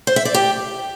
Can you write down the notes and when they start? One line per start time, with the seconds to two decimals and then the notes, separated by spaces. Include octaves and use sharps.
0.07 C5
0.16 E5
0.25 D5
0.34 G4